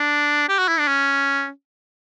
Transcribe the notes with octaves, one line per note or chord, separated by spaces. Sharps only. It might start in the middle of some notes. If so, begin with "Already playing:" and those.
Already playing: D4
G4
F#4
E4
D4
C#4